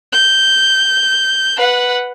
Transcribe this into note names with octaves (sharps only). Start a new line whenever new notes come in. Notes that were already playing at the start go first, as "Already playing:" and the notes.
G6
B4 F#5